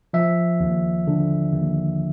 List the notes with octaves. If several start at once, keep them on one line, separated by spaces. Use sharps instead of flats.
F3 E5
D#2
D3
D#2